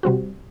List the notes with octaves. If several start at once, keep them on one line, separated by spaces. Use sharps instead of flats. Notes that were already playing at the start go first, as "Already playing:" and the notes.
C3 G3 C4 F#4